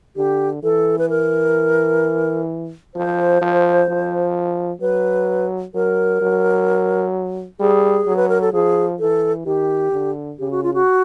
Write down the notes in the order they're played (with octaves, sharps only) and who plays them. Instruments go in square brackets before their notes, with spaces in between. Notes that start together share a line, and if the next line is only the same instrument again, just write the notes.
[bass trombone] D3 [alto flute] G4
[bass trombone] E3 [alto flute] A4
[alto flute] B4
A#4
[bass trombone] F3 [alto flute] C5
[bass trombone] F3
F3
[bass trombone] F#3 [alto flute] B4
[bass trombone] F#3 [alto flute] A#4
[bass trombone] F#3
[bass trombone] G3 [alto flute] G#4
[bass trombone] F#3
[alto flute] B4
A#4
A4
[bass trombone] F3 [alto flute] G#4
[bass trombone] E3 [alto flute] A4
[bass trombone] D#3 [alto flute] G4
[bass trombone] D3
[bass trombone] C#3 [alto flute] G4
[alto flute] F#4
F4
F#4